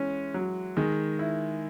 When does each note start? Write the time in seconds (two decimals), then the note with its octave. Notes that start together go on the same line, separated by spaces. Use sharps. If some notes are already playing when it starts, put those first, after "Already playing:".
Already playing: E3 G#3 C#4
0.34 F#3
0.77 D#3 G#3
1.19 E4